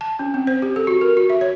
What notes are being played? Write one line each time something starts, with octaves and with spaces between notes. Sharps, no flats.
A5
C#4
C4
C5
G4
A4
F#4
A#4
F#4
E5
C#5